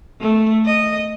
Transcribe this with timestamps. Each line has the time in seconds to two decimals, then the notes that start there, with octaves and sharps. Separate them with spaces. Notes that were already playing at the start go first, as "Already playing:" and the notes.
0.21 A3
0.66 D#5